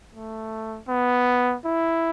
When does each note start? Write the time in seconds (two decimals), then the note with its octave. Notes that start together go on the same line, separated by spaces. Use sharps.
0.12 A3
0.88 B3
1.65 E4